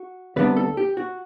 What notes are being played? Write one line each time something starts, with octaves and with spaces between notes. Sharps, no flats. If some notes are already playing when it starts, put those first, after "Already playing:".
Already playing: F#4
D2 C3 G3 B3 D4 B4
A4
G4
F#4